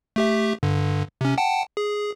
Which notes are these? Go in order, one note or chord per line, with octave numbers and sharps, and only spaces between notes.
A3 G4 E5
G2 D3
C3 C#4
F#5 G5 A5
G#4